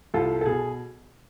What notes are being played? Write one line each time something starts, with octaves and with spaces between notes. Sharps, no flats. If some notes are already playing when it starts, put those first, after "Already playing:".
C2 F4 A4
A4
B2 G#4